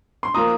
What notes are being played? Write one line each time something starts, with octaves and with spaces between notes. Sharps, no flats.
C6
F3 A#3 A#5 D#6